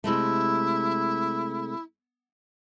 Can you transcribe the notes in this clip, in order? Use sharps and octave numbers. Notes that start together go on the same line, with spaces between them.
C3 G#3 A3 E4